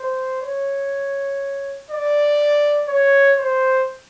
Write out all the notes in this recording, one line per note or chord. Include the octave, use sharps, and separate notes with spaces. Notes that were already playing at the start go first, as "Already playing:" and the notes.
Already playing: C5
C#5
D5
C#5
C5